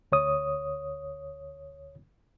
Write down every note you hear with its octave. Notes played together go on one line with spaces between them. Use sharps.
D2 C#5 D#6